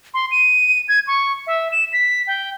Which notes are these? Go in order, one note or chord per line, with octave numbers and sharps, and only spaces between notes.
C6
D#7
G#6
C#6
E5
E7
B6
G5